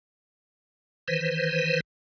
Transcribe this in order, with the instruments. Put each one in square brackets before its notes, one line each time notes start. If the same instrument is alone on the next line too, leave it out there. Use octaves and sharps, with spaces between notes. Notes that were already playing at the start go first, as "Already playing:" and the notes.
[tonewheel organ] D#3 E3 B4 C5